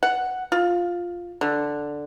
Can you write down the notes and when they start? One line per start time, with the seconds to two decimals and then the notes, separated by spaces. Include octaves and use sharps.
0.03 F#5
0.52 F4
1.41 D3